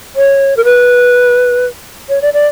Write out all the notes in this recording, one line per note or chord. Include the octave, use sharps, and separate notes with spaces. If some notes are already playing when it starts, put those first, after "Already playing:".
C#5
A#4
B4
C#5
D5
D5